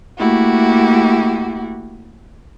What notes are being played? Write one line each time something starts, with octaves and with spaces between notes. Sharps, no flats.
A3 A#3 E4 F#4 G4